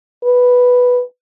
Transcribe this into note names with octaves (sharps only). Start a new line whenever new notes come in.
B4